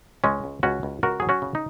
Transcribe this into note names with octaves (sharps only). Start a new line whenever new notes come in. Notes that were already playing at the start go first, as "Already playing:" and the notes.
C#2 G#3 C#4
C#2
C#2 C#4 F#4
C#2
C#2 F#4 A#4
F#3 G#4
C#4 F#4
C#3
D#4